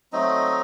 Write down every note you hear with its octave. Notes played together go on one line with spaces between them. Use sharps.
F#3 A3 C4 D#4 D#5